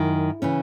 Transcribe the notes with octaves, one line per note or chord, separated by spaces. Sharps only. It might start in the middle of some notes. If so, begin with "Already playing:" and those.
Already playing: F#2 D#3 E4
C#3 E3 C#4